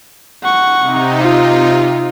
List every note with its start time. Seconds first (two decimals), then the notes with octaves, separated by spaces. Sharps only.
0.43 F#5 C#6
0.80 C3 D#4
1.20 F4